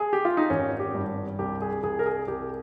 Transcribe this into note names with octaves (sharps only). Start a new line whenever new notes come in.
G#4
G4
F4
D#4
G#1 C#4
G4
G2
C2 G4
G#4
C2 G#4
A#4
G#4
C2 G4